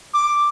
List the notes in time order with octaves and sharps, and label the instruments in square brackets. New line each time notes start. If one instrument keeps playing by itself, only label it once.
[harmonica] D6